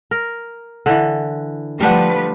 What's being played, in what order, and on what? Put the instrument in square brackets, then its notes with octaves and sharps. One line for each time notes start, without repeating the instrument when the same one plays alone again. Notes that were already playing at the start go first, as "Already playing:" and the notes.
[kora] A#4
D3 E3
[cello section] F3 A3 B4 [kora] G3 D4 F#5